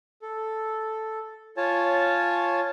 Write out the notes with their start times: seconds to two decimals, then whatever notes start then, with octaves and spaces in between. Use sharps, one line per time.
0.22 A4
1.57 F4 C#5 G#5 A5